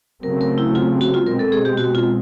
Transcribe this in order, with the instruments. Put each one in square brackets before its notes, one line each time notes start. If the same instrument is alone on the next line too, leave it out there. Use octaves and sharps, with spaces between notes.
[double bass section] C#3 F#3 A3 C4 [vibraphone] A#4
[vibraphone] A#4
E4
F4
F#4
F4
[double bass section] B2 G#3 C4 [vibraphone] A#4
[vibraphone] A4
G#4
G4
F#4
F4